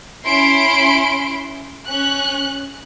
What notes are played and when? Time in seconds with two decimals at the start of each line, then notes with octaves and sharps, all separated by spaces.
0.25 C#4 E4 C6 D7
1.89 C#4 F#6